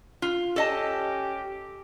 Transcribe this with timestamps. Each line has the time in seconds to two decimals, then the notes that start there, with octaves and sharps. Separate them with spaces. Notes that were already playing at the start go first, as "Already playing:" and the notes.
0.22 F4
0.56 C#4 G4 A4 D#5 A5